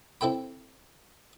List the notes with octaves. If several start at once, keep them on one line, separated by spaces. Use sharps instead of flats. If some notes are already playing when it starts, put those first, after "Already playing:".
C4 E4 A4 G5 B5